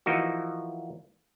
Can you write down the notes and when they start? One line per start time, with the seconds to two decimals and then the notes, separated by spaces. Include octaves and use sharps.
0.06 E3 F3 A#3 D#4 F#4